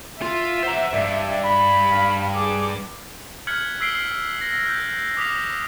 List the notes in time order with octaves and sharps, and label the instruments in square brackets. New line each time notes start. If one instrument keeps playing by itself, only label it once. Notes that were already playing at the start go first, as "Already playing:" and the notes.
[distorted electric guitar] F4 [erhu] E5
[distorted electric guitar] C5 A#5 [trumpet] F#5
[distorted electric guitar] G2 [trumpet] D5
[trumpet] B5
[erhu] F5
[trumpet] G#4 [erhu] D6
[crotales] F6 F#6 G#6 B6 C#7 F#7
E6 B6 C7 D7 G7
A#6 G7
F#6 G6
D6 D#6 F6 B6 F7